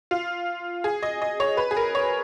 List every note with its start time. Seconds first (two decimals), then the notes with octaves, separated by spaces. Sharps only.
0.11 F4
0.84 G#4
1.03 D#5
1.22 D#5
1.40 C#5
1.57 B4
1.71 G#4
1.77 A#4
1.95 C#5